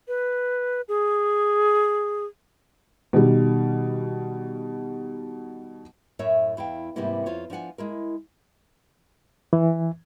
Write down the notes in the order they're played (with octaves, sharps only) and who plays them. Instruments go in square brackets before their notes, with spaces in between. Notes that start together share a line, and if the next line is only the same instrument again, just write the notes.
[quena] B4
G#4
[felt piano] B2 D#3 G3
[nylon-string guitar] F#2 A2 A3 A#4 C#5 E5
E2 E4 F5 G5
G#2 C3 G3 A#3 B3 E4
F2 F4 C5 C#5
F3 D4 E4 F#5 G#5
G#3 E4 A#4
[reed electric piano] E3